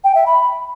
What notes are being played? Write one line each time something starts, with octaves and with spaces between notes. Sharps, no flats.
G5
E5
B5